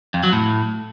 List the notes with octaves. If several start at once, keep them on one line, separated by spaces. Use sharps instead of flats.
F2
F#3
A2